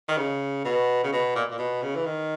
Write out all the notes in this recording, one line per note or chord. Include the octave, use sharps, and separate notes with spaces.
D#3
C#3
B2
C#3
B2
A#2
A#2
B2
C#3
E3
D#3